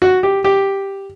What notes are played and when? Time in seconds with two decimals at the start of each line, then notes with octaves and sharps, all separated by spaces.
0.02 F#4
0.23 G4
0.44 G4